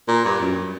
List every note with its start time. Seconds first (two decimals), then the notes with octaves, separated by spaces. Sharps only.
0.08 A#2
0.25 G2
0.40 F#2